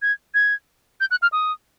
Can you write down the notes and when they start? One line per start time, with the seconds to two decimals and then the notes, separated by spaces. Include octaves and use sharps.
0.02 G#6
0.34 G#6
1.00 G6
1.11 F#6
1.22 F6
1.32 D#6